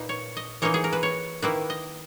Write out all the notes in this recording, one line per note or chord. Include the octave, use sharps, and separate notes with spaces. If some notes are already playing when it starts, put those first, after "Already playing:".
Already playing: A#2 A#3 D#4 B4
C#5
D#5
E3 A#3 D#4 C#5
G#4
A#4
B4
C#5
D#3 A#3 E4 B4
D#5